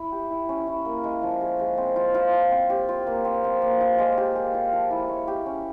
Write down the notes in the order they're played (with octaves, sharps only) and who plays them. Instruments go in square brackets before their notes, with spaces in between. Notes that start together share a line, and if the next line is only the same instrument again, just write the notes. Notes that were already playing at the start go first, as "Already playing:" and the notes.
Already playing: [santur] E4
G4
E4
C#4
E4
A#3
G#3
F3
G#4
G#3
C4
F4
F4
F4
C4
G4
F4
A#3
C4
C4
A#3
F4
G#3
G4
G#4
F4
F3
E4
C#5
G4
C#4